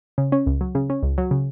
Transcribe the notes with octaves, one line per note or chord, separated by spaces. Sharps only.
C#3
C#4
C#2
F#3
C#3
C#4
C#2
F#3
C#3